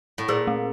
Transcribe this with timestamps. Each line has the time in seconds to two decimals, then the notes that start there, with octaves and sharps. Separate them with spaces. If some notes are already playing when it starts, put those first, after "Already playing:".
0.18 A2
0.28 A#2 G#4
0.47 A3